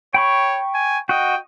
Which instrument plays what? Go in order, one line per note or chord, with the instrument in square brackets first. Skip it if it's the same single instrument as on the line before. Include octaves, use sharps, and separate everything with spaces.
[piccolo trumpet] C#5 [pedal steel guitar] G5 B5 C#6
[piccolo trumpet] G#5
[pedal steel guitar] F#4 D#5 [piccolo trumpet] G5